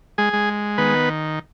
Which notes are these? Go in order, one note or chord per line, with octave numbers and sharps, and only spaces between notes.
G#3 G#4
G#3
D#3 B3 B4